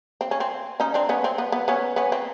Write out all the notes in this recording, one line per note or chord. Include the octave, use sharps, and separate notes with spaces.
C4
C#4
C4
C#4 D#4
C4 D4
B3 C#4
C4
B3
B3
B3 C#4
B3 C#4
C4